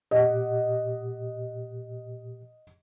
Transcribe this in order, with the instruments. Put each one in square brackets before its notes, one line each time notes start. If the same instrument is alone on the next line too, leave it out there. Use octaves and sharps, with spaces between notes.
[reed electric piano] A#2 G4 [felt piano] D#5 F#5